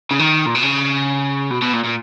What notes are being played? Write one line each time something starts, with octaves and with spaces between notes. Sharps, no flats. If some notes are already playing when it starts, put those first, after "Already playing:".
C#3
D#3
A#2
B2
C#3
B2
B2
A#2
A#2